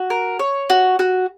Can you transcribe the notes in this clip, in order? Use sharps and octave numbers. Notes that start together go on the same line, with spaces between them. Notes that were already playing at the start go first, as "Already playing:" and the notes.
Already playing: F#4
A#4
C#5
F#4
F#4